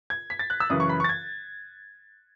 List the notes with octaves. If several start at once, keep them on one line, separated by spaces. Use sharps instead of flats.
G#6
B6
A6
F#6
E6
F#2 C#3 E3 D#6
C#6
B5
C#6
A6
G#6